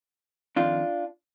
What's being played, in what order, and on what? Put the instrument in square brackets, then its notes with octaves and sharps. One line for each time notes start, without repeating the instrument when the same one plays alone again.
[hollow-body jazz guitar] F2 D#3 D4 F4